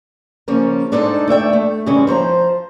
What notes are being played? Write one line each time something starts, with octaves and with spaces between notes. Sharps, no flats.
C#3 F3 A#3 C#4
G#2 D4 D#4 A4 C5 A5
A3 D5 E5 G5
A3
C#3 E3 G3 G#3 C#4
F3 C5 C#5 A#5